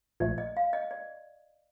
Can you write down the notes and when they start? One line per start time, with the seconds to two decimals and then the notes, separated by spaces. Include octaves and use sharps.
0.20 A#1 A#2 F3 A3 D5
0.38 D#5
0.57 F5
0.73 D#5
0.91 D5